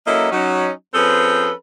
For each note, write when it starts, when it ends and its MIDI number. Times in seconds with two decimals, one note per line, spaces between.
0.07 0.31 54
0.07 0.31 58
0.07 0.31 61
0.07 0.31 64
0.07 0.31 69
0.07 0.31 75
0.31 0.70 54
0.31 0.70 61
0.31 0.70 63
0.94 1.51 53
0.94 1.51 60
0.94 1.51 61
0.94 1.51 68
0.94 1.51 69
0.94 1.51 71